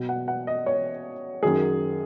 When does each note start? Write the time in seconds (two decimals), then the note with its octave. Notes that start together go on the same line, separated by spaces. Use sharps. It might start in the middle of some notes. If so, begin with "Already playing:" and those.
Already playing: B2 F#3
0.09 F#5
0.28 F#5
0.47 D#5
0.66 C#5
1.42 F#2 D#3 F#3 G#4